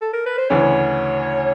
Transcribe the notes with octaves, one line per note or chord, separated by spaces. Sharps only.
A4
A#4
B4
C5
D2 C#3 E3 C#5